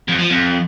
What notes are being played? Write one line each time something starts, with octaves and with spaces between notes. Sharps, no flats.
F2
F3
F2